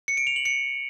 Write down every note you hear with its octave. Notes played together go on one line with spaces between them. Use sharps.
C#7
D7
F7
F#7
C#7